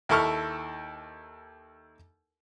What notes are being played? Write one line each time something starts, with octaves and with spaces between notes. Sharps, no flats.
D#2 E4 A4 C#6 F6